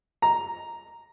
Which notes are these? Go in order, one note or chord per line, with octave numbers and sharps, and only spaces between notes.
A#5